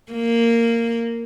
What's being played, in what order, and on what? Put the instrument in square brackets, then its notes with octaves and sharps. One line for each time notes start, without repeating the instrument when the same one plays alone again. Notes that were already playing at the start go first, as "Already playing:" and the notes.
[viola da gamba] A#3